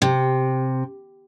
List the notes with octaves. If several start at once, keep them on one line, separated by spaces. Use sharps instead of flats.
C3